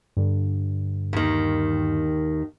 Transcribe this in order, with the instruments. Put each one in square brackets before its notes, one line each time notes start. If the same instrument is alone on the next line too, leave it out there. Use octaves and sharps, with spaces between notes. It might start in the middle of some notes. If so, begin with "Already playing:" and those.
[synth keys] G2 D3
[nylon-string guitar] D#2 D#3